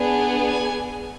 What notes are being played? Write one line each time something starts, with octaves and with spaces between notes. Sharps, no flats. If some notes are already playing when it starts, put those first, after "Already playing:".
Already playing: B3 D4 G#4
G#5